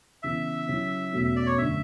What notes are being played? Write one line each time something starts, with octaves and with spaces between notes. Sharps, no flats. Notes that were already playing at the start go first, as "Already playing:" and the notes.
C#3 E3 B3 E5
C#3 F#3 C#4 E4
E2 B2 A3 C#4 F#4
E5
D5
C#5
F#2 D3 A3 D4 E5